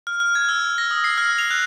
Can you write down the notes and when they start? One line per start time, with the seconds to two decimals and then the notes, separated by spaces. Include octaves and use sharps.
0.07 F6
0.20 F6
0.35 G#6
0.49 E6
0.78 A#6
0.91 D#6
1.04 C7
1.18 F6
1.38 F7
1.51 F#6